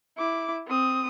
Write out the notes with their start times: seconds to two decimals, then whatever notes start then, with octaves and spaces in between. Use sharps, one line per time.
0.17 E4 D6
0.67 C4 D#6